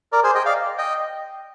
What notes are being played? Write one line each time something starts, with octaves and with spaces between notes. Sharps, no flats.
A#4 D5
G#4 C5
D#5 G5
D5 F5
D#5 G5